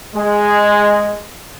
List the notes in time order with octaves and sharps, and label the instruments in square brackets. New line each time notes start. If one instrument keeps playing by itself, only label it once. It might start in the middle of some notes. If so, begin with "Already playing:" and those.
[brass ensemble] G#3